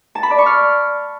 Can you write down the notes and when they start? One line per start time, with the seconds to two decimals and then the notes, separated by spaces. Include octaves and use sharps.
0.15 A5
0.23 B5
0.31 D5
0.39 C#6
0.46 F6